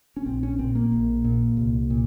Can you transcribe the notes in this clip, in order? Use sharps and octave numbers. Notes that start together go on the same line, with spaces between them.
C#4
A#1 C4
C#4
A#2 C4
A#3
A#1
A#2
C2
A#2